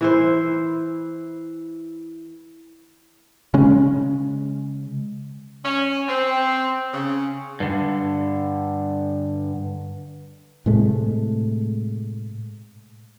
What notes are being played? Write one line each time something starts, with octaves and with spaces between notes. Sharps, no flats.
E3 E4 C5
C#3 G#3 C#4
C#4
C4
C#3
G2 D3
A2 C3 G#3 A3